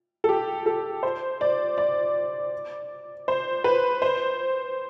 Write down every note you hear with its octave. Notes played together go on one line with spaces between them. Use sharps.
A4
G4
A4
C5
D5
D5
C5
B4
C5